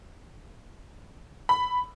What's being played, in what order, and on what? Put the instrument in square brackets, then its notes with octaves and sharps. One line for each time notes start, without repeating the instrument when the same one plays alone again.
[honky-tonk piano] B5